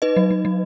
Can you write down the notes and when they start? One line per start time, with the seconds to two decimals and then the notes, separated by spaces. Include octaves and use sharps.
0.02 D#4 B4 D#5
0.17 F#3
0.31 F#3
0.45 F#3